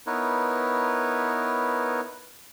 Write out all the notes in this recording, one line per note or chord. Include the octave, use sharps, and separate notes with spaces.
B3 D#4 E4 A#4 B4 C#5